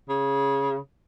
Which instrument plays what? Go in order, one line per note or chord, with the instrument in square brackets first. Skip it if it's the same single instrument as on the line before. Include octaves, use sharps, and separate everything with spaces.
[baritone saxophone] C#3